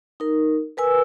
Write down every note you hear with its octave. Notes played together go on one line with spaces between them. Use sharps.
D#4 A#4
A#4 B4 G#5 E6